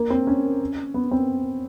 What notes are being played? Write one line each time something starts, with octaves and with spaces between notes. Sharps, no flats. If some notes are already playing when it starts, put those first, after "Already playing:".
Already playing: A#3
C4
C#4
B3
C4